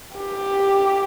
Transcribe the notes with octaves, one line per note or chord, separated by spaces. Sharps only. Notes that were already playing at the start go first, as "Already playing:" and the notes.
G4